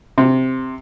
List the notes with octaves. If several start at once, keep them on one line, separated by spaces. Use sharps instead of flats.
C3